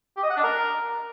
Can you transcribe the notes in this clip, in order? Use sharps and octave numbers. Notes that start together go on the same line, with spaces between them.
G4
D#5
F#5
D4
A#4